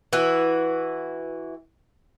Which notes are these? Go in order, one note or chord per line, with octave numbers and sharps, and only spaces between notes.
E3 F#4